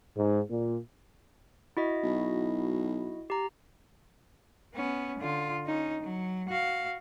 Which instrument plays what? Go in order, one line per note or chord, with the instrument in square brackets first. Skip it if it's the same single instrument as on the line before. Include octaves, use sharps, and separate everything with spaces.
[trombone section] G#2
A#2
[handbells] E4 F#4 D#5
[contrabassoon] B1
[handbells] G4 A#5
[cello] B3 C#4
D3 F4
C#4 D#4
F#3
F#4 F5